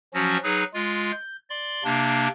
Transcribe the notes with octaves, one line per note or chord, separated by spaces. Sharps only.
F3 F#3 C#4 F#4
F#3 D#4 G#4 B4
G#3 F4
G6
D5 C6
C3 A#3 D4